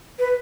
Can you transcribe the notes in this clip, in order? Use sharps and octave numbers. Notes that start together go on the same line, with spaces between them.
B4